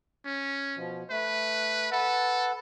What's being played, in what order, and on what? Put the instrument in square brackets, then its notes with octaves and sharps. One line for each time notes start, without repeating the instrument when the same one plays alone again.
[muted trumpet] C#4
[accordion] B2 F3
[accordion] A3 [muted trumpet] B4
[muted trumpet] A4 [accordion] B4 F#5